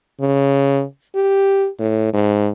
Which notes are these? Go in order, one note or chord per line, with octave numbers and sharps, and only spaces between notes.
C#3
G4
A2
G#2